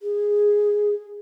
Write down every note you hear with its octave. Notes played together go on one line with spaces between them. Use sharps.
G#4